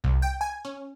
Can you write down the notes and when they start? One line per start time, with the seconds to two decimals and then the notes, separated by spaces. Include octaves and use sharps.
0.04 C2
0.22 G5
0.41 G#5
0.65 C#4